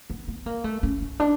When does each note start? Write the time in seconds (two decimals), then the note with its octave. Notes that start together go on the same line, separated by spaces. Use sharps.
0.10 B3
0.28 B3
0.46 A#3
0.64 A3
0.83 C#4
1.01 C#4
1.20 D4